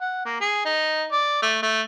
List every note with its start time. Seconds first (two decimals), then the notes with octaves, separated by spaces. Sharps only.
0.01 F#5
0.25 A#3
0.41 G#4
0.65 D#4
1.12 D5
1.42 A3
1.63 A3